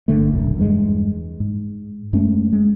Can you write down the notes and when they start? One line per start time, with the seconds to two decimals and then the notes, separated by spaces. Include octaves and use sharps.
0.08 G1 D3 A3
0.33 D#1 B1 F#2
0.56 E2 G2 G#3
1.40 G#2
2.13 F#2 G#3 A3 C#4
2.52 G#3